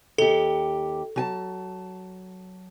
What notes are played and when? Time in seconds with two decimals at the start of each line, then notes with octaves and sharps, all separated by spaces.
0.18 D#2 G4 A4
1.16 F#3 G#5 A5